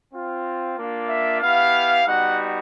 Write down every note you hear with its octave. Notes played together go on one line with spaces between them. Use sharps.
C4 F4
A#3 D4 F4
E5
B3 E4 G4 F5
G3 B3 D#4 F#4 F#5